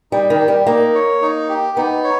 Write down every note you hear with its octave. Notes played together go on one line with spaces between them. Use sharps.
G3 D#4
D#3
G4
G3
A#3 D#4
C#5
D#4
G4
B3 D#4
C#5